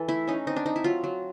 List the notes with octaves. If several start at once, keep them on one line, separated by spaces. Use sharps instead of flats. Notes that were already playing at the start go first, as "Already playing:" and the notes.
Already playing: E3 A4
A3 E4
C#4 D#4
C4 D#4
D4
C4 D#4
E4
F#3 F4
F#3